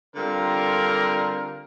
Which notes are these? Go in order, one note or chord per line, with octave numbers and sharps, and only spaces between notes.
D3 G3 C4 F4 A#4